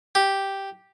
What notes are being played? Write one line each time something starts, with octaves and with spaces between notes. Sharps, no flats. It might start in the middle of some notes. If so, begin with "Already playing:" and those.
G4